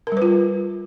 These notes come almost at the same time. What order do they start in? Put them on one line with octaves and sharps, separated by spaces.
A#4 G3 B4 F4